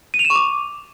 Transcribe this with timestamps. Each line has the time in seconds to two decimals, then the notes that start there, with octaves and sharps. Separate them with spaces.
0.14 D#7
0.19 F7
0.25 E7
0.30 C#6
0.36 D6